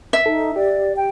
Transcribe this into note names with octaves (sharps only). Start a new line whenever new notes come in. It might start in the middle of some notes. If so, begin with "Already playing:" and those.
E5
D#4 A4
G4 D5
G5